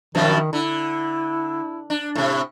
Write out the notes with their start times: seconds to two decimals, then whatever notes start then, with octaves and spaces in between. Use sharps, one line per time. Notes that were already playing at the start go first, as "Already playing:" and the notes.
0.15 F#2 B2 D#3 F3
0.53 D3 E4
1.90 D4
2.15 A2 C3